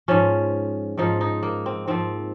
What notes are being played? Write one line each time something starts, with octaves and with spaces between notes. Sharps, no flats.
G#2 F3 C#4
G#2 F3 D#4
D#4
A#3
C4
G#2 F3 C4